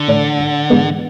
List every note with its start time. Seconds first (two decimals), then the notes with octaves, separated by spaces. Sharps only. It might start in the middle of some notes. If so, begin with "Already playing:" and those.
Already playing: D3
0.08 A2 E3 A3 D4
0.39 G#1
0.70 G#2 E3 G#3 B3